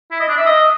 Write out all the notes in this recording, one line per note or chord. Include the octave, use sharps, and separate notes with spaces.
E4
D#5
D4
E5
D#5